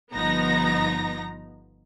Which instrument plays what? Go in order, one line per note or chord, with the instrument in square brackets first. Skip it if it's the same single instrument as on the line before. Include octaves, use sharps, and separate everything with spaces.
[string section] G1 F3 B3 D#4 A#5 A#6